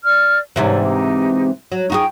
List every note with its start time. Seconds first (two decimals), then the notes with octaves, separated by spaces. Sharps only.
0.04 D5 F6
0.56 G#2 C3 E3 C#5 D5
0.80 D#4 G4
1.72 F#3 C#5
1.90 D#4 F4 F#4 G#4 G5 C#6